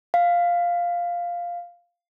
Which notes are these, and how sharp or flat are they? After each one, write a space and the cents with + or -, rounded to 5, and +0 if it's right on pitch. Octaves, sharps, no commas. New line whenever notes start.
F5 +0